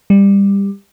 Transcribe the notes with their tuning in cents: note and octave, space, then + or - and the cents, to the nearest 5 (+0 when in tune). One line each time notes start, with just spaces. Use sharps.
G3 +20